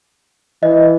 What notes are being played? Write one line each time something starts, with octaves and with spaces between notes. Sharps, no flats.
E3 D#5